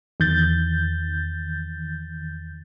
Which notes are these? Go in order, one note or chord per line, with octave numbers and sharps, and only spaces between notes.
E2 D#3 G6 A6